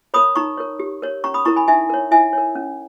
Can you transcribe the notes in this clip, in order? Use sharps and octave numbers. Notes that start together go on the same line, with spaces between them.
A#4 C#5 B5 D#6
D#4 A#5 C#6
A#4 C#5
G4
A#4 C#5
C#4 A#5 C#6
B5 D#6
E4 A#4 A#5 C#6
G#5 B5
D#4 E5 G#5
A#4 C#5
E4 E5 G#5
A#4 C#5
C#4